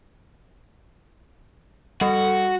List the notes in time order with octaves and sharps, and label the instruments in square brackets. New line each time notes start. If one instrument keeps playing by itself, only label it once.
[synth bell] G3 A4 [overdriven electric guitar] F#4